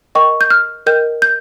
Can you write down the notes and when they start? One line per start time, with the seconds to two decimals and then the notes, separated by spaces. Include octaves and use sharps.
0.15 A#4 D#5 G5 C#6
0.41 G6
0.50 F6
0.86 A#4 D#5 G5 G6
1.22 G6